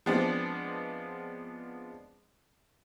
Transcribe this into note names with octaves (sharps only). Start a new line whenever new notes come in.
F3 G#3 B3 C4 D4